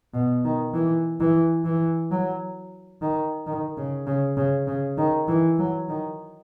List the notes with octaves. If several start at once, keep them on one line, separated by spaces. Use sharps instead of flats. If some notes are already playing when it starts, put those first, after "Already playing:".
B2
D#3
E3
E3
E3
F#3
D#3
D#3
C#3
C#3
C#3
C#3
D#3
E3
F#3
D#3